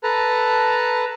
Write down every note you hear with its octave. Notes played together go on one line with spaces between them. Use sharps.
A4 B4 A5 A#5